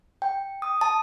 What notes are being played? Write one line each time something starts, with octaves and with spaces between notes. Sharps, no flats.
G5
D#6
A5